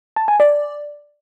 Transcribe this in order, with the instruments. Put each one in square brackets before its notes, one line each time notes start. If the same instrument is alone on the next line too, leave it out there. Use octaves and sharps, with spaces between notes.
[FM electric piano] A5
G#5
D5